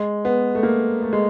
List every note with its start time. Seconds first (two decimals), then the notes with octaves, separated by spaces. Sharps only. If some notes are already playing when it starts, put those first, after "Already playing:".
Already playing: G#3
0.25 B3
0.55 A3
0.63 A#3
1.02 A3
1.13 G#3